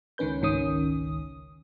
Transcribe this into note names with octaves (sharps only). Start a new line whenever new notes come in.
C#2 D#3 C#4 B4 G6
G#1 C#2 D#3 C#4 D#6